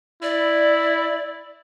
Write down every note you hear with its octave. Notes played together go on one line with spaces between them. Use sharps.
E4 D5